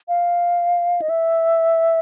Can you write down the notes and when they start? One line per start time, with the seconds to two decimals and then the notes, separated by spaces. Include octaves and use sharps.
0.08 F5
1.02 D#5
1.09 E5